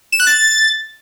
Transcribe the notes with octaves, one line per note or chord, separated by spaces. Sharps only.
E7
F#6
A6